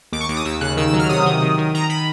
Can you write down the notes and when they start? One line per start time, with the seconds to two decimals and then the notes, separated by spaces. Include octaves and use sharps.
0.12 D#2 D6
0.21 C#6
0.29 D#2 D6
0.37 D#6
0.45 D#2 E6
0.61 C#3 F#6
0.77 D#3 E6
0.88 E6
0.93 F#3
0.99 F6
1.09 C3 D#6
1.26 D#3
1.42 D#3
1.58 D#3
1.74 D#3 A#5
1.90 D#3 B5